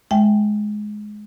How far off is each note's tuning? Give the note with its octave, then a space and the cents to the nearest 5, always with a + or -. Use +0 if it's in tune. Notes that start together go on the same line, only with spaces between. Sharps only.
G#3 +15 E5 +0 G5 -10